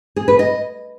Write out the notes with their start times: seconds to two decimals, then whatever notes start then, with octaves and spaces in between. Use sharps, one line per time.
0.16 G#4
0.28 B4
0.39 D#5